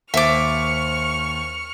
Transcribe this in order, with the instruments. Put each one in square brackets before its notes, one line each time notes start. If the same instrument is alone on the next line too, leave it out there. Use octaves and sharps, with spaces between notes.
[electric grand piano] D#2 C5 A6 [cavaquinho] E5 D6 [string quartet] C#6 F6